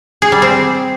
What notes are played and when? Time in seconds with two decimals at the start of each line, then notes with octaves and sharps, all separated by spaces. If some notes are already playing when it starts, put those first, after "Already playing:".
0.22 G#4
0.32 G3
0.42 C4